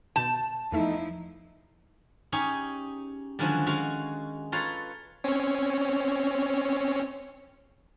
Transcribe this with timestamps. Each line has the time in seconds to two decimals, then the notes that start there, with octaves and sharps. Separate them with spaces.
0.16 B2 A5 G6
0.72 E2 F3 A3 D#4 E4 E5
2.32 C#4 D#4 G4 G#4 C#5
3.39 D3 D#3 F3 F#3 G#3 C#4
3.67 G#3 F#4 F5
4.52 F4 A4 B4 C#5 A#5 C6
5.24 C4 C#4 C#5